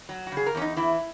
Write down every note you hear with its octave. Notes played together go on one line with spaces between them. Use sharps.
F#3
F#4
C#3
G#4
A#4
E2 C#4
D#4
E3 E4